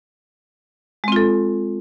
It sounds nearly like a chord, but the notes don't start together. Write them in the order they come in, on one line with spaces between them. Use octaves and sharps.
G#3 C4 F4 A4